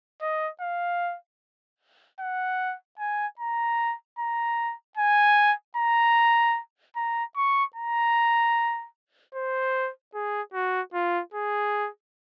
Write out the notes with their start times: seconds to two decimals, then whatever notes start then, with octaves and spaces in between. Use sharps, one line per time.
0.22 D#5
0.61 F5
2.20 F#5
2.99 G#5
3.39 A#5
4.19 A#5
4.97 G#5
5.77 A#5
6.96 A#5
7.36 C#6
7.76 A#5
9.35 C5
10.14 G#4
10.54 F#4
10.94 F4
11.34 G#4